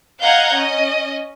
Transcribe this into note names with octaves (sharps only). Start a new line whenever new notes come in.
D#5 F5 F#5 A#5 G6 G#6
C#4 D#5